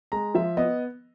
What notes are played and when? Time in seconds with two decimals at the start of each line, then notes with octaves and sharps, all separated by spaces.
0.12 G#3 A#5
0.35 F3 E5
0.57 B3 D#5